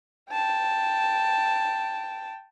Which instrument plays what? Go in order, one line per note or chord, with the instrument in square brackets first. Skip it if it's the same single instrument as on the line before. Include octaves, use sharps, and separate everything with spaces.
[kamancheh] G5 A5